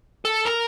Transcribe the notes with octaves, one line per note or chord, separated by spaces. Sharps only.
A4
A#4